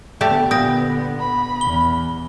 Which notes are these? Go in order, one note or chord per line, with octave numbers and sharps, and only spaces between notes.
D3 A3 B3 G4 D5
A#2 G5 D#6 A#6
B5
E2 G7